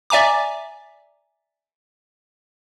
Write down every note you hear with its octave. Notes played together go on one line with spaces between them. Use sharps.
D5 E5 G#5 A#5 D6